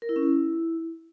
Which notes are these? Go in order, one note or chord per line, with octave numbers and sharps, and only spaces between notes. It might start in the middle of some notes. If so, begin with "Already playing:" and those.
A#4
E4
C#4
E4